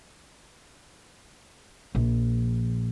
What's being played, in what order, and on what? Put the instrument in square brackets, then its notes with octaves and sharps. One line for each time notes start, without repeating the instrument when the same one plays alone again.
[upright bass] A#1